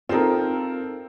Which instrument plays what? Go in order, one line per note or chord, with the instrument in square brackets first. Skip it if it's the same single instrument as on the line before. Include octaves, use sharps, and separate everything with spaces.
[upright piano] C4 A4 A#4 [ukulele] D#4 F4